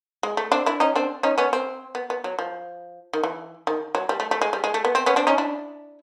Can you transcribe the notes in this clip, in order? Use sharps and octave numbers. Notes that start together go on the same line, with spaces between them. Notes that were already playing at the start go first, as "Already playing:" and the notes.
G#3
A3
C4 D4
D4 E4
C#4 D#4
C4 D4
C#4 D#4
B3 C#4
C4
B3
B3
F#3
F3
D#3
E3
D#3
F#3
G3
A3
A3
G#3
G3
G#3
A3
B3
C4
B3 C#4
C4 D4
C#4 D#4
D4 E4